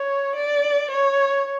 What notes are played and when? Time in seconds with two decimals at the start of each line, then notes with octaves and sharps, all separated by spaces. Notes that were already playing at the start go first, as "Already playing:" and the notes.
Already playing: C#5
0.35 D5
0.91 C#5